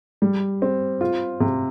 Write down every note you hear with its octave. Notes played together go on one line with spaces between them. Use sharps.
G3
C4
F4
C3